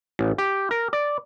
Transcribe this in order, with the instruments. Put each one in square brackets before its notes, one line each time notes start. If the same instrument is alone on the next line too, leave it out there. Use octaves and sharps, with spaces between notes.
[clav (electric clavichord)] A1
G4
A#4
D5